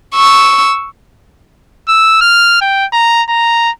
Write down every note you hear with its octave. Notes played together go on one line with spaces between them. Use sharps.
C#6 E6
E6
F6
G5
A#5
A#5